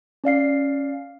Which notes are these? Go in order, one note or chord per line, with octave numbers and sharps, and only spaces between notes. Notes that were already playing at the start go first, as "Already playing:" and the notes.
C#4 D5 F5 C7